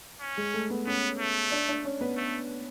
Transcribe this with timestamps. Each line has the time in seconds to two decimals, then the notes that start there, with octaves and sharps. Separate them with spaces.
0.21 C#4
0.37 G#3 G#4
0.54 A3 A4
0.70 B3 B4
0.86 B3 C#4 C#5
1.19 A3
1.52 D4 D5
1.68 D4 D5
1.85 C#4 C#5
2.01 B3 B4
2.17 A3